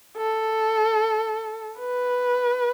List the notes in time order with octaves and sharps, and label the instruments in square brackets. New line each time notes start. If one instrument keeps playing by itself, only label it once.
[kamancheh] A4
B4